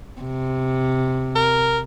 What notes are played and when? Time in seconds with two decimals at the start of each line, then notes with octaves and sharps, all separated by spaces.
0.21 C3
1.36 A#4